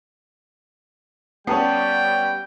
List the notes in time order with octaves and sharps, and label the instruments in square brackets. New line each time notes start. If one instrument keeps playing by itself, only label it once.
[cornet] G3 [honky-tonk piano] B3 C#4 [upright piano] F#5 A5 D#6 [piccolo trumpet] G5